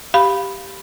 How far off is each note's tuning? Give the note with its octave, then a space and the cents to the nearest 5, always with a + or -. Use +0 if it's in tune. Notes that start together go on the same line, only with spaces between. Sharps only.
G4 +0 F5 +0 B5 +0